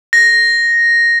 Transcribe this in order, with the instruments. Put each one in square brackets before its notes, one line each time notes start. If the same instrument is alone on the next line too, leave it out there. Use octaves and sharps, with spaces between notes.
[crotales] A#6